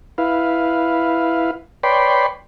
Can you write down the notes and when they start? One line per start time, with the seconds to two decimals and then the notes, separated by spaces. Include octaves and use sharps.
0.18 E4 B4 F5
1.83 B4 C#5 D5 G5 B5 C6